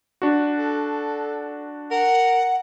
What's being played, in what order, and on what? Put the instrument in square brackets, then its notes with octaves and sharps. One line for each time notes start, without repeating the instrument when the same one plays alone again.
[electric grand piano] D4 F#4
[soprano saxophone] A4
[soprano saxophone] A#4 [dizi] F#5